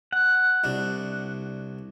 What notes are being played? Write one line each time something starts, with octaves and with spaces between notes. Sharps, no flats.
F#5
C2 D4